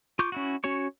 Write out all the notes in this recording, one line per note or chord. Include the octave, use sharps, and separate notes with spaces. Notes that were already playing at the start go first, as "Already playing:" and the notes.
F4 C#6 D6 G6
C#4 E4 F#4
C#4 F#4 C#5 C#6